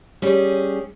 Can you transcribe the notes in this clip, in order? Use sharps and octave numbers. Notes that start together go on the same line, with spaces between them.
G3 C#4 G#4